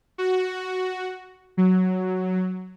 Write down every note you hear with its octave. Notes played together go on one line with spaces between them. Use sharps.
F#4
F#3